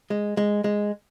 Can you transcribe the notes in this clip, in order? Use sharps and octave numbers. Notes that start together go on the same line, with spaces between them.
G#3
G#3
G#3